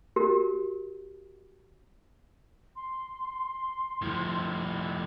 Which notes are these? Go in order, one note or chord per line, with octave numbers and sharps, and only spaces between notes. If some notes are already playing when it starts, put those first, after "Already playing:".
F#4 G4 A#4
C6
A2 F3